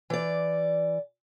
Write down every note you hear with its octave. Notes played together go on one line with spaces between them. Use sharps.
E3 D5